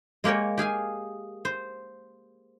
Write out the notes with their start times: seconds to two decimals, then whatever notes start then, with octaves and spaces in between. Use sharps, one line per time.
0.24 G#3 A#3 G4 A#4 C#5
0.57 G4 G#4 F5 G#5
1.45 C5